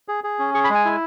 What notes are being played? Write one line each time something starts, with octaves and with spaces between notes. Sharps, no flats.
G#4
G#4
C#4
G#4 C#6
B5
G#3
G#5
E4